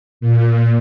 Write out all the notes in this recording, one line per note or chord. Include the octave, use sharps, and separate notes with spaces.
A#2